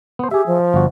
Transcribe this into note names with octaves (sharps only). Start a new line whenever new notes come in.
B3 C5
G4 G#4 E5
F3
G1 F#4